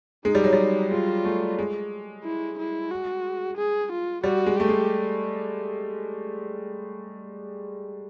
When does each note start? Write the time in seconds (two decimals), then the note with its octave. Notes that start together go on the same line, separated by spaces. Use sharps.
0.25 G#3 D#4
0.35 G3
0.44 F#3
0.53 G3
0.91 G#3 F4
1.25 A3
1.59 G#3
2.24 E4
2.58 E4
2.91 F#4
3.57 G#4
3.91 F4
4.24 G3 F#4
4.46 G#3
4.57 A3 G4
4.69 G#3